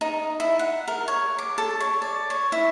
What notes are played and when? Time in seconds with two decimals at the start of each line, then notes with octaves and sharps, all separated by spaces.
0.01 D#4
0.40 E4
0.59 F#5
0.88 A#4
1.08 C#5
1.38 D6
1.58 A4
1.80 C#5
2.02 D5
2.30 C#5
2.52 E4